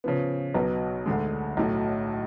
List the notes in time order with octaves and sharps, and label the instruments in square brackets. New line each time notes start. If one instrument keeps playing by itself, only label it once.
[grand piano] C#3 F3 B3
B1 B2 F#3 B3
D2 D3 G#3
B1 A2 F#3